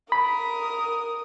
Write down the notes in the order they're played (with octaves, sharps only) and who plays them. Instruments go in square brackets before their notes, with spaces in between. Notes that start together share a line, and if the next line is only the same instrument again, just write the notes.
[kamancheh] A#4 D#6 [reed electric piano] B5